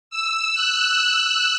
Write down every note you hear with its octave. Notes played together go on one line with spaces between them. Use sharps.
E6
F#6
E6